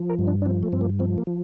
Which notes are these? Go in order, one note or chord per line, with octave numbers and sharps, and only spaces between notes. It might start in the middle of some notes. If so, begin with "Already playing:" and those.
Already playing: F3
A#4
G2
D4
D4
F3 C4
A3
G2 C4
A#3
F3 C4
A#3
F3